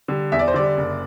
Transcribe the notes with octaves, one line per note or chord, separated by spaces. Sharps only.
D3 G3
E2 E5
D5
C5
D3 G3 D5
F#1